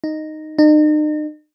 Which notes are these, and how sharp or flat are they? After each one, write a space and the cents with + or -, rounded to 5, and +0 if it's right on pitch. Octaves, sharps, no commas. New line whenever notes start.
D#4 -5
D#4 -40